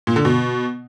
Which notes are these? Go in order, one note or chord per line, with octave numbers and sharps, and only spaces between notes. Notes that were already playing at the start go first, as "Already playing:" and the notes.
A#2
D3
B2